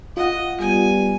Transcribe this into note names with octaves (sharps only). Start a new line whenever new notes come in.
F4 D#5 F#5
G3 B3 G#5